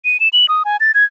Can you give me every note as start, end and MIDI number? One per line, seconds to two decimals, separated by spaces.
0.05 0.20 99
0.20 0.29 100
0.33 0.46 102
0.49 0.63 87
0.65 0.77 80
0.80 0.92 93
0.95 1.04 92